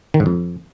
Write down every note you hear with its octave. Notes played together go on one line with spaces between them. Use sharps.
D#3
G#2
F2